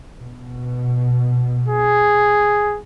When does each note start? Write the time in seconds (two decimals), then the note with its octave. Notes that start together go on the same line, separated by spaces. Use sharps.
0.21 B2
1.68 G#4